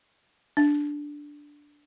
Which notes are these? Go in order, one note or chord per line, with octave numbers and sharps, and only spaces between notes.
D4